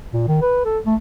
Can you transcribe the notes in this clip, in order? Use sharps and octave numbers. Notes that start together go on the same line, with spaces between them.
A#2
D#3
B4
A4
A3